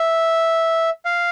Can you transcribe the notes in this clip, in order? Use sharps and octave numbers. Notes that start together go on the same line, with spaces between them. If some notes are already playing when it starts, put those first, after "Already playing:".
Already playing: E5
F5